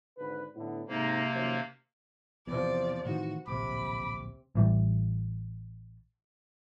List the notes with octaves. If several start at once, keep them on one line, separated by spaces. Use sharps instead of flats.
G#1 D3 B4
A2 D3 B3
G#2 C3 A#3 C4 A#5
F#2 D#3 F3
E2 C3 F3 D5
A2 D#3 E3 F#4
D1 A#1 C3 B5 D6
A1 E3 G3